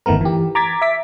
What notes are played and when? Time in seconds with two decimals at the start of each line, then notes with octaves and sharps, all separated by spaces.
0.06 G1 D#3 A3 B3 A#4
0.21 E3 G4
0.55 A#5 D6 G#6 A6 B6
0.82 E5 D6 B6